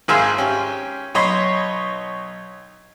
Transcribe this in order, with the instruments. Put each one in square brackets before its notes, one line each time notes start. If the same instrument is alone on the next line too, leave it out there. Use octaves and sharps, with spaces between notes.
[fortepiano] G#1 G#2 G#4 E5 F5 C6
C#4 G4
B1 C#5 D#5 B5 C6